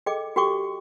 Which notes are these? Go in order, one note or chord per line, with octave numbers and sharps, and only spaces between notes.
G#4 A4 D#5 G5 D6
F#4 G4 A4 G5 C#6 D6